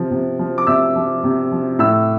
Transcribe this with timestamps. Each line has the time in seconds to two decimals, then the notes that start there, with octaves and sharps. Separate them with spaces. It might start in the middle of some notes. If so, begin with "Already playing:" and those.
Already playing: C3 F3
0.11 C3
0.39 F3
0.58 D6
0.67 C3 E5 E6
0.96 F3
1.23 C3
1.52 F3
1.79 A2 E5 E6